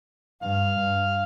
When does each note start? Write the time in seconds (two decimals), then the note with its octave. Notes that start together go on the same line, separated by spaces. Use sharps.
0.42 G2 F5
0.79 G2